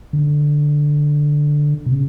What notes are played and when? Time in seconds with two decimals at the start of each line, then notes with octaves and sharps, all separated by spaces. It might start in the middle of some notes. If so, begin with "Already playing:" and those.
0.13 D3
1.86 B2
1.92 C#3